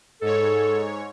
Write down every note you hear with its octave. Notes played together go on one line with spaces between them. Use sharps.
G#2 A4 C#5